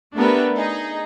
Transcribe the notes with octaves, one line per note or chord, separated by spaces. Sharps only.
A3 B3 D4 G4 A#4 E5
D#4 G#4